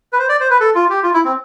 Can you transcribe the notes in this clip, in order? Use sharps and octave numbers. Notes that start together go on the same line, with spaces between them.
B4
C5
D5
C5
B4
A4
F4
G4
F4
E4
C4